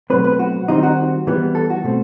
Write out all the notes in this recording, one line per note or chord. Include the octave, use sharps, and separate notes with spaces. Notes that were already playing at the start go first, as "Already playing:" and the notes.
B2 F#3 A3 C4 B4
B4
F#4
D#3 G3 C4 D#4
F#4
E3 G3 B3
A4
F#4
B2 A3 C4